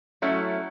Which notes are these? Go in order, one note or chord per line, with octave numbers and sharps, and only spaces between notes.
F#3 A3 C#4 E4 A4